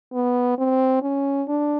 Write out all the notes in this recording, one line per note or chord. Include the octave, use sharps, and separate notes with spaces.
B3
C4
C#4
D4